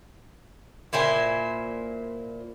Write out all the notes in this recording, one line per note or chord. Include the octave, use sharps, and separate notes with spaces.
A#2 E4 C5 G#5